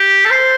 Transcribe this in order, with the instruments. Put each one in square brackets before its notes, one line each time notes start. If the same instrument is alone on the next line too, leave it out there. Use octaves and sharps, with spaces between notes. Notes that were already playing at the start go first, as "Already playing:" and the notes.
Already playing: [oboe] G4
A4
C5